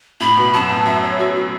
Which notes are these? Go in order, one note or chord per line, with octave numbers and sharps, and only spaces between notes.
A2 B5
B2
F#2 A5
A2
F#2 E5
C#5
F#4
F#4